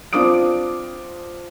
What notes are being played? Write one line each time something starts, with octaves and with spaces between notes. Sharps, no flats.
C4 D4 F4 D6 D#6 D7